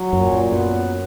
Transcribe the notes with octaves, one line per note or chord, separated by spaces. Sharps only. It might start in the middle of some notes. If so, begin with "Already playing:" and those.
Already playing: F#3
F#2 A#2
F#2
F#2 B3